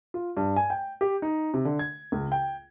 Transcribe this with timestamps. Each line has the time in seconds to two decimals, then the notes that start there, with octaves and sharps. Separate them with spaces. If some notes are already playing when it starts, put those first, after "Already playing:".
0.14 F4
0.37 G2
0.56 G#5
0.70 G5
1.01 G4
1.22 D#4
1.54 C3
1.65 D3
1.79 G#6
2.12 C#2
2.32 G5